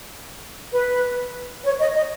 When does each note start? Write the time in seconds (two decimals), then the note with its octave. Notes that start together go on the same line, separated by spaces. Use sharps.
0.72 B4
1.64 C#5
1.79 D#5
1.95 D#5